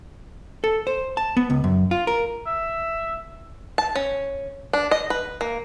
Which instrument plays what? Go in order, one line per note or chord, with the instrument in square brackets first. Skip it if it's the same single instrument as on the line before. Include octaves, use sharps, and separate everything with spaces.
[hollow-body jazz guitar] A4
C5
A5
B3
C#2
F#2
F4
A#4
[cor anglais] E5
[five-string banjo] A5
C#4
D4
D#5
B4
A#3